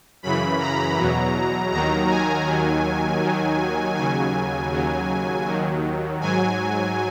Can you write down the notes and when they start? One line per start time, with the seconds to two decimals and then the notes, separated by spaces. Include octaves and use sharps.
0.23 F#2 C#3 E3 B5
0.60 A#5
0.97 E2 B2 F#3
1.72 D#2 D#3 F#3 A#5
2.09 G#5
2.47 D#2 D#3 F#3
3.22 D#2 D#3 F#3
3.96 D#2 C#3 F#3 G#5
4.72 D#2 C#3 F#3
5.46 D#2 D#3 F#3
6.21 G#2 F#3 G#5